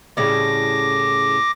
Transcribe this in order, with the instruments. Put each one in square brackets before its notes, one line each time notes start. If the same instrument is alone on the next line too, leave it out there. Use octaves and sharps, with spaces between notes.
[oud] A2 C#3 G3 [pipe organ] D6 A#6